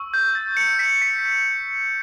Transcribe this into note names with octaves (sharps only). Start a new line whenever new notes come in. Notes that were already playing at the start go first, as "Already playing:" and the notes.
Already playing: C#6 E6
G6
A6
C#7
B6
B6